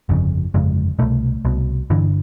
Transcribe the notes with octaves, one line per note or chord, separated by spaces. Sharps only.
G1 F2 C#3
G1 F2 C#3 G#3
C2 B2 A3
C2 B2
G1 G2 D3 E3